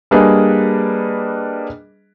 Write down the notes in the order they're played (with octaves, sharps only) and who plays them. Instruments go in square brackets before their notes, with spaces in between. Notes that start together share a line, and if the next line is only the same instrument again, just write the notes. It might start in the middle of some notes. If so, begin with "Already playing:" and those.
[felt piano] G3 A#3 D4 G#4 B4 D#5